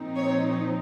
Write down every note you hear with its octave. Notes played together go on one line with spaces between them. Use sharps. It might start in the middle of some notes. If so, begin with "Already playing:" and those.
Already playing: A#2 F3 C4 D#4
C#5